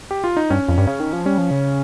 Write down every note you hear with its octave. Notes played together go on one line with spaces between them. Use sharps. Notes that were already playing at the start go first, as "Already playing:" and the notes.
G4
F4
D#4
G2 C#4
F2
G2
C#3
D#3
F3
G3 C#4
F3
C#3